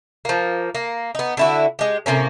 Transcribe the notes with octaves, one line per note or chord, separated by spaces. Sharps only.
F3 A#3
A#3
B3 D#4
D3 E4 F#4
G#3 G4
A2 C3 A#3 C#4